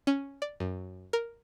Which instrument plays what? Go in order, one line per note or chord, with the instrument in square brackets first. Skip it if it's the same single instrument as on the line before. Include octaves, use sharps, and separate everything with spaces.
[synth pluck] C#4
D5
F#2
A#4